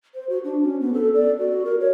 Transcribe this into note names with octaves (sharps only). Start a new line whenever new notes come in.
C5
F#4
D4
C#4
B3
A4
D5
F#4
A#4
C#5